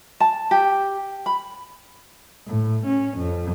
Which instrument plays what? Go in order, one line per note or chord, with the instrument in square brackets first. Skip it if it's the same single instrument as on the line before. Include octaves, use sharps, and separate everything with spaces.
[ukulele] A5
G4
B5
[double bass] A2
C#4
F2